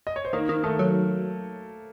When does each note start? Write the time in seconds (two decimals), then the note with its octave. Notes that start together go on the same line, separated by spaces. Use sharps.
0.07 D#5
0.16 C#5
0.25 C5
0.33 D#3 A#3 A#4
0.49 D#3
0.64 D#3 A3 A4
0.79 F#3